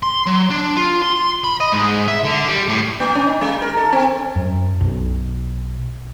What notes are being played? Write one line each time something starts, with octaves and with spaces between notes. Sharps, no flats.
C6
F#3
D4
F4
C6
B5
D#5
G#2
E5
D3
G3
A2
A#3
C#4
D#4
G#3
A#4
A4
C4
F#2
B1